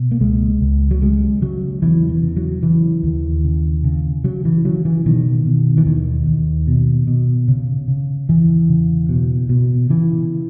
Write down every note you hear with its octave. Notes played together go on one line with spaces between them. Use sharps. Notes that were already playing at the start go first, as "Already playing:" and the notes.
Already playing: B2
A#3
C#2 G#3
C#2
F#3
C#3 G#3
C#3 F#3
E2 E3
E3
C#3
F#3
C#3 E3
D#2
C#3
C#3
C#3 F#3
E3
C#3 F#3
E3
B2 D#3
B2
E3
D#2 D#3
D#2
B2
B2
C#3
C#3
E2 E3
C#3
B2
B2
C#3 E3